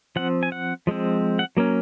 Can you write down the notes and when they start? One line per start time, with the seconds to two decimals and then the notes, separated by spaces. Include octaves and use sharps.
0.16 F3 C4 F#5
0.43 G#5
0.52 F#5
0.87 F3 G#3 C4
1.39 F#5
1.57 F#3 A#3 C#4